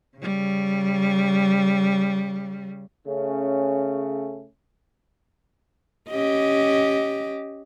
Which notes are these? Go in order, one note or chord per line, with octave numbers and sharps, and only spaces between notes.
C#3 G3
C#3 A3 C#4
C#4 G4 D#5